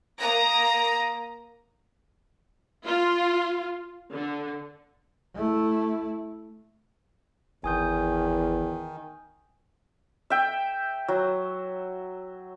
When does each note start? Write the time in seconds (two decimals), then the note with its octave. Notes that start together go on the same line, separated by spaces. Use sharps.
0.19 A#3 A#5 D#6 A#6
2.87 F4
4.14 D3
5.35 A3 E4
7.64 G1 E2 D#3 G#5 D#6 G6
10.30 E5 G5
11.08 F#3